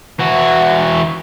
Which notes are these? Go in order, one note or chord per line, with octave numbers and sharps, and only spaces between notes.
E3 F#4